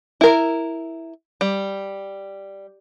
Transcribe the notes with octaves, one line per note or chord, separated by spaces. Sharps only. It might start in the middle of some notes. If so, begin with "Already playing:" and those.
E4 A#4
G3